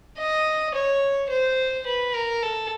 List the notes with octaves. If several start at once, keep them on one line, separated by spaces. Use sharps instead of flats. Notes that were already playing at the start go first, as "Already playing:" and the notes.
D#5
C#5
C5
B4
A#4
A4